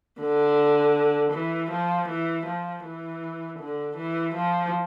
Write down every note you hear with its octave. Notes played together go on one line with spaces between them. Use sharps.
D3
E3
F3
E3
F3
E3
D3
E3
F3